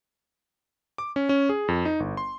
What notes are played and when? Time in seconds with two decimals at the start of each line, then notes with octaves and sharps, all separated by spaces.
0.98 D6
1.16 C#4
1.29 C#4
1.49 G#4
1.68 F2
1.85 D#4
2.00 G1
2.17 C6